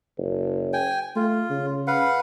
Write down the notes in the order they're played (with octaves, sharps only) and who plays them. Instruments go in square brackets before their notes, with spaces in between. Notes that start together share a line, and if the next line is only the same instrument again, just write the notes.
[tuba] F#1
[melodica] G5 G#5
[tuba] A3 [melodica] F4
[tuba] C#3
[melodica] B4 F5 F#5